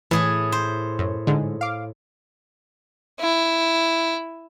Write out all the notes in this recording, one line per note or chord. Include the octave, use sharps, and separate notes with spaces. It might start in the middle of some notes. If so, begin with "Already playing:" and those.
A2 E3 G#4 G#5
C5
F#2
G#2 D3 G#3
F5 D6
E4